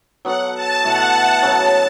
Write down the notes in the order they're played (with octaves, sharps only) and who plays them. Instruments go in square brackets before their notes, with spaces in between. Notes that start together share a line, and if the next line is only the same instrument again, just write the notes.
[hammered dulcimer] F#3 B3 F#4 A4 [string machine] F#5
[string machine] A5
[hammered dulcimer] B2 A3 E4 [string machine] F#5
[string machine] F#5
[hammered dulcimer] C#3 F#3 C#4 F#4 [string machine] A5